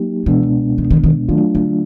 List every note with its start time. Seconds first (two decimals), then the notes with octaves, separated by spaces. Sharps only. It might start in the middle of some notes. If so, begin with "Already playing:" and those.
Already playing: F#3 A#3 D#4 G4
0.26 C#2 B2 E3 G#3 B3 D4
0.78 D#3
0.91 D#3
1.04 D#3
1.29 D#3 F#3 A3 D4 F4
1.55 D3